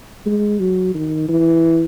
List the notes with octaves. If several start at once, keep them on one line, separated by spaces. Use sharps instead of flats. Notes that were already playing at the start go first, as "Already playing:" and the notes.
G#3
F#3
D#3
E3